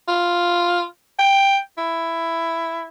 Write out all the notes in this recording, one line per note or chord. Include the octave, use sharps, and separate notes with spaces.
F4
G5
E4